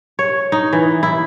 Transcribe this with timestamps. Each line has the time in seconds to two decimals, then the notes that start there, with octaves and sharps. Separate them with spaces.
0.19 C#5
0.52 D#4
0.73 E3
1.03 E4